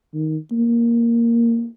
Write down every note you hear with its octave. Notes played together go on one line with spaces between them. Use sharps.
D#3
A#3